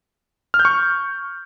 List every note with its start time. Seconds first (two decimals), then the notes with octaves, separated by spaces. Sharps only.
0.54 F6
0.59 G6
0.65 C#6